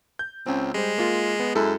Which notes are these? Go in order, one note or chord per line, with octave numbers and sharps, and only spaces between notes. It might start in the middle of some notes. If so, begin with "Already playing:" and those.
G6
C#2 C4 C#4
G3 G#3 C5
A#3 F4
B3
F#2 G#3 E4 A4